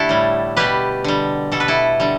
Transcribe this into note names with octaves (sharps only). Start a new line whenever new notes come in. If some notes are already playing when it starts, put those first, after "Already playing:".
Already playing: D3 A3 D4 E4 G4 A4
A2 G3
B2 G3 G4 B4
D3 G3
B2 G3 A4
B4
E4 A4
D3 G3